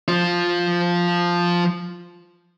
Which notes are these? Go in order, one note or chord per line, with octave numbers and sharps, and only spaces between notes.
F3 F4